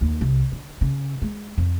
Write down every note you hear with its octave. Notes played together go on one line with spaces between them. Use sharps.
D#2
C2
D3
C#3
G#3
F2